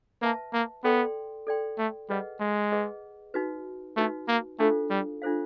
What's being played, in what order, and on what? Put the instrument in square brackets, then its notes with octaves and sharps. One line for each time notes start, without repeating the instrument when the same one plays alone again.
[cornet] A#3 [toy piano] B4 E5 A5
[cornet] A#3
[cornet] B3 [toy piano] A4 D5 G5 C6
[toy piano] A4 D5 G5 C6
[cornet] A3
[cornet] G3 [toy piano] G#4 B4 D#5 F#5
[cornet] G#3
[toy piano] G#4 B4 D#5 F#5
D#4 F#4 B4
[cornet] A3 [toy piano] D#4 F#4 B4
[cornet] A#3
[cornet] A3 [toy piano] D4 F4 A4 C5 F5
[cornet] G3
[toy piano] D4 F4 A4 C5 F5